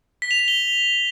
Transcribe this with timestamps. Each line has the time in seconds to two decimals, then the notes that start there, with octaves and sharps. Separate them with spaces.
0.22 B6
0.31 F7
0.39 B6
0.48 G7